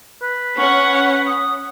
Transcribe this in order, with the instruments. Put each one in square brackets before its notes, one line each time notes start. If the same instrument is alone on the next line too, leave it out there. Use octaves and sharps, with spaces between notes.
[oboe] B4
[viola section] C#4 F#5 [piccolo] C#6
[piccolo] D#6